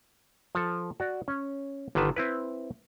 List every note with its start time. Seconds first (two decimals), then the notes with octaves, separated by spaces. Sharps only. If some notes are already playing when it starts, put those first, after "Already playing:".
0.55 F3 A4
1.00 F#4 D5
1.28 C#4 C#5
1.95 G1 D3 D#3 B4 A5
2.16 C4 E4 B4